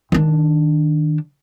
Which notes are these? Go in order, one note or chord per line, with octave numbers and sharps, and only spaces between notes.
D#3 D4